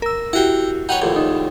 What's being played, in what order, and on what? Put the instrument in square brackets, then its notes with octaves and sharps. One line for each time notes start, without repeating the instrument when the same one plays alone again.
[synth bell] A#4 E6
[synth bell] E4 F#4 G4 [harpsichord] F#5 G5
[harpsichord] D#4 B4 C#5 [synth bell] F#5 G5
[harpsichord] A#1 D#2 A2
[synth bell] D#4